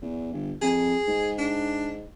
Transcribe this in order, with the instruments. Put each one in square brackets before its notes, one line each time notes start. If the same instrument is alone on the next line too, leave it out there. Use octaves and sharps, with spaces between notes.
[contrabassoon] E2
G1
[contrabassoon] F2 [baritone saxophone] G#4
[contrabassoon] G#2
[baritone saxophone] D4